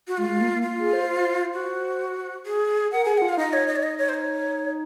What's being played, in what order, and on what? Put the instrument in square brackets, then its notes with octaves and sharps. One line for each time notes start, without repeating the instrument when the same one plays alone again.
[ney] F#4
[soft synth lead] G#3 [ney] F4
[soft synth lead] G#3
A#3
A#3
[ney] F4
[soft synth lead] G#4
C5
C5
[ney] F#4
G#4
[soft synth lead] A#4 [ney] F#5
[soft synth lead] G#4 [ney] G#5
[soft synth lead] F4 [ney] F#5
[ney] F5
[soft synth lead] D#4 [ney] D#5
[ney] C#5
D#5
C#5
D#5
C#5
C5
C#5